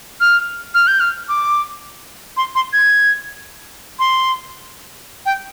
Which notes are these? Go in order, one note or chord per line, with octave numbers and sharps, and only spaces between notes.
F6
F6
G6
F6
D6
C6
C6
G#6
C6
G5